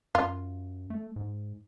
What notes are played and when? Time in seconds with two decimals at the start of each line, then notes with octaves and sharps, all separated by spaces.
0.15 F#2 F4
0.90 A3
1.16 G#2